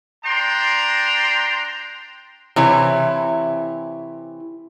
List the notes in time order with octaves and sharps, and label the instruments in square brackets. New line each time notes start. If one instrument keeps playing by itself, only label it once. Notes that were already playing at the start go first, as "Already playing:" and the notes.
[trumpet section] D4 G5 A#5 C6
[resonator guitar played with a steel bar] C3 E3 E4 C#5